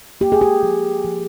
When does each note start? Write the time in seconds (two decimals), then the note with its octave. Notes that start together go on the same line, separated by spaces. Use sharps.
0.21 A#3 G4
0.32 G#4
0.41 G4
0.63 F3
1.05 F3